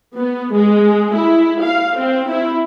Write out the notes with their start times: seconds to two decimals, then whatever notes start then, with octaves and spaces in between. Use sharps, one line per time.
0.16 B3
0.54 G#3
1.15 E4
1.62 F5
1.97 C4
2.30 E4